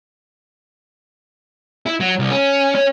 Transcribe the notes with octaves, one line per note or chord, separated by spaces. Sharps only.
E4
F#3
C2
C#4
C#4